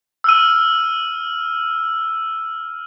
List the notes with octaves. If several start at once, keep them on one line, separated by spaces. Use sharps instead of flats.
E6 F6 D#7